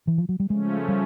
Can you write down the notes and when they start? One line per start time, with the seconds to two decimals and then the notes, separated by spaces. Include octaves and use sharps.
0.07 E3
0.18 F3
0.29 F#3
0.40 G3
0.50 C#3 F3 G#3 A3 C#4
0.88 G3